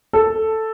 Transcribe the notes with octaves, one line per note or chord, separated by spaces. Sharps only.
A4